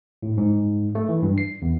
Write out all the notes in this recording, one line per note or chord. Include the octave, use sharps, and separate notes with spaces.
A2
G#2
A3
E3
G2
C7
E2